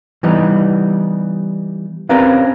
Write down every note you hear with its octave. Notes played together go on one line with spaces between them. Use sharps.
E3 G3 B3 D#4
C4 C#4 G4 A#4 B4 F5